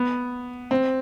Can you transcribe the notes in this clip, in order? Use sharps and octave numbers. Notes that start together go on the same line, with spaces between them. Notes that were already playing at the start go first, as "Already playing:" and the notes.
Already playing: B3
C4